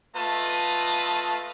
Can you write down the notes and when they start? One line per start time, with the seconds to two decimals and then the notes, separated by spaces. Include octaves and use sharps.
0.15 A3 F4 B4 D#5 A5